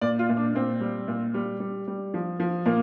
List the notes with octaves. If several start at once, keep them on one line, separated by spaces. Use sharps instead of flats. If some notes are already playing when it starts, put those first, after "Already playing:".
A#2 D5
F4
A#2
D4
A#2 C4
G3
A#2
G3
G3
G3
F3
F3
A#2 A#3